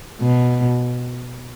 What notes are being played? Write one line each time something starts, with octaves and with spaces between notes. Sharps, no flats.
B2